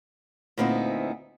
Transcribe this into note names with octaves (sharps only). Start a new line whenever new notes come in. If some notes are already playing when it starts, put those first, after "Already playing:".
D2 A#2 B3 C4 D#4 E4